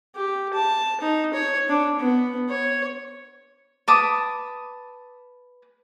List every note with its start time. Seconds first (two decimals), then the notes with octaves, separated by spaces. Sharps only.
0.16 G4
0.54 A5
1.01 D#4
1.34 C#5
1.69 D4
2.00 B3
2.49 C#5
3.88 B4 A5 D6 D#6